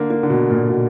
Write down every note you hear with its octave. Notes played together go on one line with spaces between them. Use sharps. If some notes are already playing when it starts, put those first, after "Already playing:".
Already playing: D3 A#3
A#3
D3
B2
A#2
B2